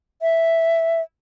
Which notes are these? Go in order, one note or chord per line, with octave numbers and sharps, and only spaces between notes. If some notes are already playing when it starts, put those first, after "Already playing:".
E5